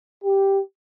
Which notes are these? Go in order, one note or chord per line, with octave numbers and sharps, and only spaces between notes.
G4